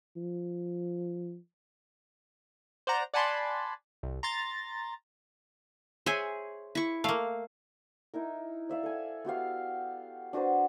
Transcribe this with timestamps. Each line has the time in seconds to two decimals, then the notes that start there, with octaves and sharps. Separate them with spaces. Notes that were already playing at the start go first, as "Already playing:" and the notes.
0.17 F3
2.87 C5 D5 F#5 A#5
3.14 D5 F#5 G#5 A5 B5 C6
4.03 C2
4.23 A#5 C6 A6
6.06 G#4 C5 C#5 E5 G#5
6.75 E4 C#6
7.04 A3 A#3 F5
8.14 D#4 E4 A#4
8.69 D5 E5 F5
8.83 A4 G#5
9.25 B3 F#4 G4 F5
10.33 D4 F#4 B4 C5